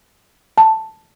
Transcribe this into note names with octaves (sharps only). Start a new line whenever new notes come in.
A5